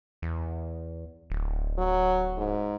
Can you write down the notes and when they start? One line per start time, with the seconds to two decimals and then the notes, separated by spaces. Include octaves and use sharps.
0.22 E2
1.30 D1
1.78 F#3
2.37 G#2